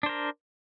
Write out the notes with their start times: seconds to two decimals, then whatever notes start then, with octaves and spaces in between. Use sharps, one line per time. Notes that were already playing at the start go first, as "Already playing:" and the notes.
0.03 D4
0.06 C5
0.09 A#4